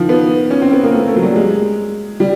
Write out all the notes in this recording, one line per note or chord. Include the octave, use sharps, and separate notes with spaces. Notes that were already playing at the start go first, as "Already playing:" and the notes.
Already playing: D#3 F3
B3
C#4
C4
B3
A#3
A3
A3
F#3
G3
G#3
G3